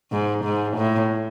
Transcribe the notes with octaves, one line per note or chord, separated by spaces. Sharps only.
G#2
G#2
A2